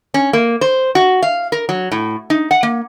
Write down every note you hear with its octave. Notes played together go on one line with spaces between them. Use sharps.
C#4
A#3
C5
F#4
F5
A#4
F#3
A2
D#4
F#5
A#3